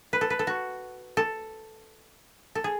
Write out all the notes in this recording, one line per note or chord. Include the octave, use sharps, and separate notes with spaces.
B4
A4
B4
A4
F#4
A4
A4
G#4